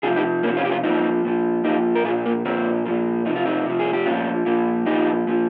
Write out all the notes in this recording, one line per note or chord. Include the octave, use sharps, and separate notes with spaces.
C3 F3 F4 G#4
D#4 G4
C3 F3 A#3 C#4
C#4 F4
G4
C#4 F4
A#2 F3 C4 D#4
A#2 F3
A#2 F3 D#4 G4
A#4
A#2 F3 F4 G#4
A#3
A#2 F3 C4
A#2 F3
C3 F3 D#4
F4
C4 D#4
C3 F3
G#4
G4
A#2 F3 C#4 F4
A#2 F3
A#2 F3 D#4 G4
A#2 F3